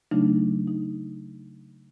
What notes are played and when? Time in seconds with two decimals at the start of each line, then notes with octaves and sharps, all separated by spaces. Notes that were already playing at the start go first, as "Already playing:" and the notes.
0.11 C#3 F#3 A3 D4 D#4
0.67 D#4